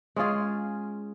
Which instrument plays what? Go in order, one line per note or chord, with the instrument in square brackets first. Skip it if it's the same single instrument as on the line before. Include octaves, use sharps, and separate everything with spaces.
[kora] G#3 C#4 F4 G#4